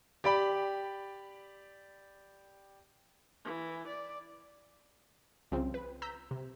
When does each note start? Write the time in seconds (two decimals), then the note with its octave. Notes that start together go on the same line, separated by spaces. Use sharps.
0.24 G4 D5 G5 B5
3.44 E3
3.87 D5
5.52 C2 C#3 F3 C4
5.74 B4
6.02 A#5 E6 G6 B6
6.31 C3